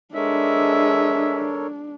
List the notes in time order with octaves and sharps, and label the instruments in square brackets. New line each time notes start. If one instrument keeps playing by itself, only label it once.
[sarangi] G#3 [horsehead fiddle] D4 [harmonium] A4 A#4 C#5 [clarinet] E5